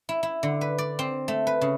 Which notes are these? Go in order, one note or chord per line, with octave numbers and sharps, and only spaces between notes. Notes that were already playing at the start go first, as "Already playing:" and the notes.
E4
E4
D3
B4
D5
C4
A3
B4
C#3